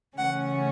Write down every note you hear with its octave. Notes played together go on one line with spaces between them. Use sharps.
C#3 E3 A3 C#4 F#5